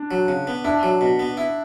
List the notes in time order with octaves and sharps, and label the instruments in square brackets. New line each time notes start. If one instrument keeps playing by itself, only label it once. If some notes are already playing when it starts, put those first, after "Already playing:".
Already playing: [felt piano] D4
[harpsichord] F#3
C#3
B3
[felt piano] D4 [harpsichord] E4
[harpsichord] F#3
B2
B3
E4